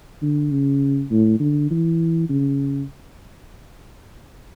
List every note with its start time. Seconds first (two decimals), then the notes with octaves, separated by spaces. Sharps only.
0.22 D3
0.51 C#3
1.11 A2
1.40 D3
1.71 E3
2.29 C#3